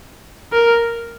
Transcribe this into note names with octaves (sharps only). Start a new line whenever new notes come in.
A#4